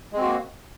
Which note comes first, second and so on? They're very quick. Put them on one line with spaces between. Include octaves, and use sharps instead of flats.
G#3 C4 F#4 A#3